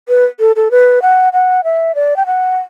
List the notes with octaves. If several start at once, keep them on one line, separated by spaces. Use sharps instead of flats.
B4
A4
A4
B4
F#5
F#5
E5
D5
G5
F#5